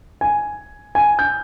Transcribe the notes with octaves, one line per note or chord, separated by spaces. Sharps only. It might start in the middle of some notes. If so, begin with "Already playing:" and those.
G#5
G#5
G6